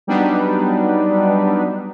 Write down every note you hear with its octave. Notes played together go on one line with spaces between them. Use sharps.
F#3 G3 B3 D4 D#4 B4